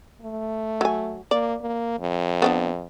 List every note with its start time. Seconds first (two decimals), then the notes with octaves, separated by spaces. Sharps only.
0.21 A3
0.81 F#3 G#5
1.31 A#3 D5
1.62 A#3
1.99 F2
2.42 B3 C#4 D4